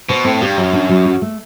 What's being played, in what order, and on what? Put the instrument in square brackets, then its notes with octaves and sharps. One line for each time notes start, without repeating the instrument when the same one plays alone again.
[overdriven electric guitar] B2 [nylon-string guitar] C5
[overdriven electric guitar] A2 [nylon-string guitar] C4
[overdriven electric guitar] G2 [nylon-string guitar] G4
[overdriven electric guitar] F#2 [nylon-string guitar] F#3
[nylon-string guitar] D4
F#3
F#4
A3